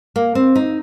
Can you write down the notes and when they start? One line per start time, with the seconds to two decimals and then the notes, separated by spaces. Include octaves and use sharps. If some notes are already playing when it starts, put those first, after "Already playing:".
0.16 A#3
0.35 C4
0.56 D#4